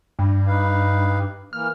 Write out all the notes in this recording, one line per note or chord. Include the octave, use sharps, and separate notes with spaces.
G2
D#4 B4 F5
E3 A#3 F6